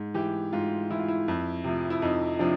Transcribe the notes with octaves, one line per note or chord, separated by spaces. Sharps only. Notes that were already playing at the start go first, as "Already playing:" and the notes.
Already playing: G#2
E3 G4
G#2 F4
E3 E4
F4
E4
F2
C3 F3
E4
F2 D#4
C3 F3 D4